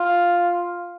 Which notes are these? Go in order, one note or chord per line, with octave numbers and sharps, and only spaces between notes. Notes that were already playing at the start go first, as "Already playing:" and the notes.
Already playing: F4